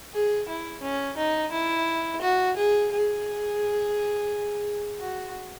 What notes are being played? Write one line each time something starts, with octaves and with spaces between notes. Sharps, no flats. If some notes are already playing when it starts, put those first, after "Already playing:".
G#4
E4
C#4
D#4
E4
F#4
G#4
G#4
F#4